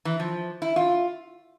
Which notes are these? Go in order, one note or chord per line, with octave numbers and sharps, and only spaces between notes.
E3
F3
E4
F4